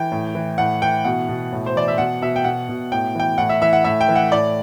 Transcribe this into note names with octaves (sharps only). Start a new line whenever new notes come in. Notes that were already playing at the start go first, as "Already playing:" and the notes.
Already playing: E3 G5
A2
E3
A2 F#5
E3 G5
B2 F#5
B2
A2
C5
E3 D5
E5
B2 F#5
B2 E5
G5
B2 F#5
B2
A2 G5
E3 G5
A2 F#5
E5
E3 E5
F#5
A2 E5
G5
E3
F#5
A2 D5